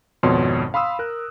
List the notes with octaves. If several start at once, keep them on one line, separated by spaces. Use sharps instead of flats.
G#1 F2 B2 C#5 C6
F5 B5 C6 D#6 E6
A#4 F#6